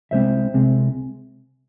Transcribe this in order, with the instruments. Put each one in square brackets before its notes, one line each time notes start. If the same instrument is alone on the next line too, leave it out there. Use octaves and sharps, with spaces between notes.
[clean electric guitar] C2 C3 G#3 C4 C5 E5
C2 C3 G#3 C4